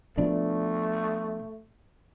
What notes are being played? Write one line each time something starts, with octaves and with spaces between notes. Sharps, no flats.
B2 F3 A3 D4